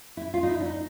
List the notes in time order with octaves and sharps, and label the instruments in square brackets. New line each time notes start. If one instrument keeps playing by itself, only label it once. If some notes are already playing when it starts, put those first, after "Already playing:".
[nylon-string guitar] E4
F4
D#4
E4
D4
D#4